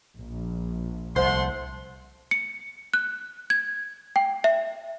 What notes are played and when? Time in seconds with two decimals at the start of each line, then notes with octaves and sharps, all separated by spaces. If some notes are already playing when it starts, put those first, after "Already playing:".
0.18 A#1
1.16 C2 A3 C5 F#5 C6
2.31 C#7
2.94 F#6
3.50 G#6
4.16 G5
4.44 E5